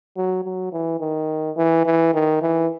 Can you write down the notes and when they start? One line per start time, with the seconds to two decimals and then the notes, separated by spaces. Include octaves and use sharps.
0.16 F#3
0.44 F#3
0.72 E3
1.00 D#3
1.57 E3
1.85 E3
2.14 D#3
2.42 E3